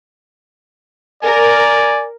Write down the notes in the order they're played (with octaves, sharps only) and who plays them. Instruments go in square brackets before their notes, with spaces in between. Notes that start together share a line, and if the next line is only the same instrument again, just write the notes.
[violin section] A#4 [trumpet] D5 [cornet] G#5